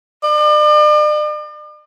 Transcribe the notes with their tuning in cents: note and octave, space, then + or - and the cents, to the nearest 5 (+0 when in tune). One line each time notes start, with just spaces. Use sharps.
D5 +40